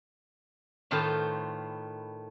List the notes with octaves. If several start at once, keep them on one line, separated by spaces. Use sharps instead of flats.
A2 D#3 F4 A4 B4 C5